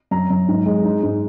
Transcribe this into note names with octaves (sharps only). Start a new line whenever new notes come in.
F#2 A#5
F#2
G#2
G#3
D#4
G#2